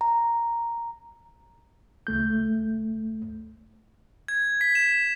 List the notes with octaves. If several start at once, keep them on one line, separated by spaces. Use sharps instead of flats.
A#5
C#2 A3 G6
G#6
B6
E7